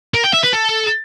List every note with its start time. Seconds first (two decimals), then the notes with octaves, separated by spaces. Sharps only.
0.14 A#4
0.24 G5
0.34 E5
0.44 B4
0.53 A4